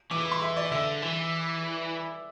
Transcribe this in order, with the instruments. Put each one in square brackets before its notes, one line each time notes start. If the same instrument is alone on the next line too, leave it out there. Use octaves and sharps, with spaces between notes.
[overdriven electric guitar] E3 [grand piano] D6
[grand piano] D6
C6
E5
D5
[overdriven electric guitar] D3 [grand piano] E5
[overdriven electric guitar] E3